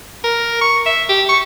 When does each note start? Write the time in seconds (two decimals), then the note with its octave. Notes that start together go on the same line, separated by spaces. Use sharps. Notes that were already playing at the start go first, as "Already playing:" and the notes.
0.24 A#4
0.61 C#6
0.86 E5
1.09 G4
1.29 C#6